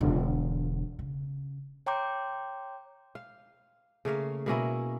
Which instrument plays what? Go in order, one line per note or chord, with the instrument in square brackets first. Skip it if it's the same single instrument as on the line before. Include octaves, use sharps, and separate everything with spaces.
[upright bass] E1 D3
C#3
[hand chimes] C#5 G5 A#5 C6 D6 G6
[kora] F5
C#3 A3 A#3 F5
B2 A#3 C#4 E4